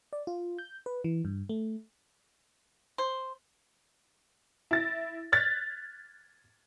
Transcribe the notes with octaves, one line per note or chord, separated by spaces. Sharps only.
D5
F4
G6
B4
E3
G2
A3
C5
E4 A6 A#6
F6 F#6 G#6 A6 B6